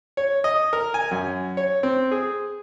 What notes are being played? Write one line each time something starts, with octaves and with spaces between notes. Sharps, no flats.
C#5
D#5
A#4
G#5
F#2
C#5
C4
G#4